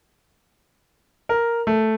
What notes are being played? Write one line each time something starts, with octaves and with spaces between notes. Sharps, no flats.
A#4
A3